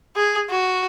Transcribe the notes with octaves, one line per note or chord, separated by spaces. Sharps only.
G#4
F#4